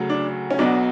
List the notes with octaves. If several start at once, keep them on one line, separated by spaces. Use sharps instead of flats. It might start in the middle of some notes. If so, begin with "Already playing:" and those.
Already playing: D2 C#3 F#3 A3
D4
C#4
B1 B2 F#3 B3 D4